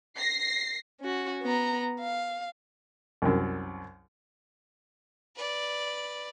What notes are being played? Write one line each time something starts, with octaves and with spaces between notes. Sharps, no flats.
A#6 C7
C#4 F#4
B3 A#5
F5
C2 F#2
B4 D5